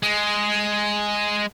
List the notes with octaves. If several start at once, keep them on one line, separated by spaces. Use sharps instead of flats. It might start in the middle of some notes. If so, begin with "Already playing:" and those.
G#3